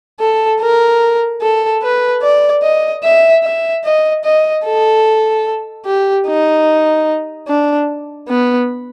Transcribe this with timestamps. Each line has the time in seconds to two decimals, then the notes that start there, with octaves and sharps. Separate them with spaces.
0.20 A4
0.61 A#4
1.41 A4
1.82 B4
2.23 D5
2.63 D#5
3.03 E5
3.43 E5
3.84 D#5
4.24 D#5
4.65 A4
5.86 G4
6.27 D#4
7.48 D4
8.28 B3